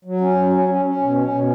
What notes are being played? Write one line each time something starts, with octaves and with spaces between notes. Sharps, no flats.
F#3
C#4
F#3
C#4
C#4
C#4
B2
C#4
B2